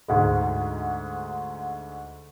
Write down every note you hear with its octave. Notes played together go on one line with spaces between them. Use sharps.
D2 G#2 G#3